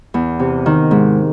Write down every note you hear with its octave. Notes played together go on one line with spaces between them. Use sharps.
E2
C3
D#3
G#2